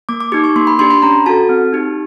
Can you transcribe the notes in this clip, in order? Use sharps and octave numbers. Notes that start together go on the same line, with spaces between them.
A#3 D6
D6
D#4 G4 D6
C#6
A#3 C6
B5
D4 G4 C6
B5
C#4 A#5
F#4 A4 A5
C4
D#4 G4